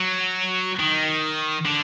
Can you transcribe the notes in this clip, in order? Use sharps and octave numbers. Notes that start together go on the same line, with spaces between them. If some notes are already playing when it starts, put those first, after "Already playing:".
Already playing: F#3
D#3
D3